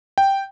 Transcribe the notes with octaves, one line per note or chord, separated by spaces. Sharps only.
G5